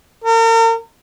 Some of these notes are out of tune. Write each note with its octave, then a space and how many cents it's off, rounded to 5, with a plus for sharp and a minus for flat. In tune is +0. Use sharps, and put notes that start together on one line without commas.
A#4 -40